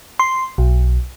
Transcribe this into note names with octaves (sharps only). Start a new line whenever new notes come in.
C6
B1